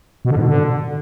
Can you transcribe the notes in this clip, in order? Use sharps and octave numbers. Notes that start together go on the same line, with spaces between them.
B2
D3
G#2
B2
D3